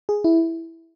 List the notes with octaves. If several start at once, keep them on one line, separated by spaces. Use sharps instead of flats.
G#4
E4